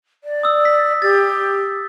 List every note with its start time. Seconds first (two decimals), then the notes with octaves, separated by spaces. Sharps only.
0.24 D5
0.43 D#6 E6
0.65 B6
1.02 G4 A6